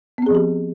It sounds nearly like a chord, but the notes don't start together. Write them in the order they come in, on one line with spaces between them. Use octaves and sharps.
B3 C4 G#4 F3 G4